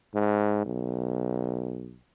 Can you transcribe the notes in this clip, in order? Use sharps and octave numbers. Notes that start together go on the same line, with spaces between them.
G#2
B1